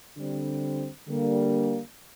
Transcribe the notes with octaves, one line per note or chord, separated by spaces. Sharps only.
D3 G3 C4
D3 G3 A#3